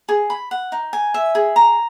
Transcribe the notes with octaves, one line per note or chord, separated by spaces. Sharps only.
G#4
B5
F#5
D#4
G#5
E5
G#4
A#5